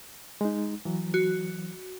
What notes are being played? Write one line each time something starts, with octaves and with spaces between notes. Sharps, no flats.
G#3 D#4
E3 F#3
F#4